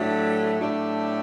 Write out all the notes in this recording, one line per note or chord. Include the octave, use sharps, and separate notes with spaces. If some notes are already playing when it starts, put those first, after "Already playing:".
Already playing: A2 F#3 A3 D4 G4
A2 F#3 A3 D4 G4